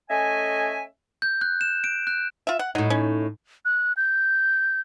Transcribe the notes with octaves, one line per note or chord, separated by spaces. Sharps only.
A3 C#4 D#5 E5 G#5
G6
F#6
E7
D7
F#6
F4 E5
F#5
A2 F#3 D#4
C#4
F#6
G6